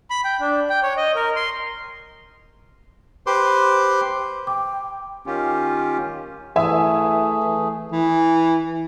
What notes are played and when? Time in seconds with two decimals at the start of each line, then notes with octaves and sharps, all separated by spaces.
0.10 B5
0.24 G5
0.40 D4
0.70 G5
0.83 C#5
0.97 D#5
1.16 A#4
1.36 C6
3.26 G4 B4 C5 C6 D6
4.47 G5 D6
5.26 D#3 C#4 F4 G4
6.56 E3 A3 G#4 E5 G#5
7.91 E3